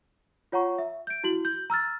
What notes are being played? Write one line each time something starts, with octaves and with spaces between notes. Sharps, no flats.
F4 C#5 F#5 A#5 C#6
E5
G6 D7
E4 F#4 F#7
G6
A#5 E6 F6 A6